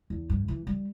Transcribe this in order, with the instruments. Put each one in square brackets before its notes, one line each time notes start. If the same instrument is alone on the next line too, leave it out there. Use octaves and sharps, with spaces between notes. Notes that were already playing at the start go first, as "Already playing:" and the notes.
[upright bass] E2
G2
E3
G3